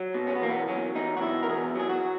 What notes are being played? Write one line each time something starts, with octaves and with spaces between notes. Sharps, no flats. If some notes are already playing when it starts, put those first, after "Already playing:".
Already playing: F#3
B2
C#4
B3
E2 A#3
B3
F#3 C#4
E2 D#4
F#4
B2 E4
A#4
E2 G#4
F#3 G#4
F#4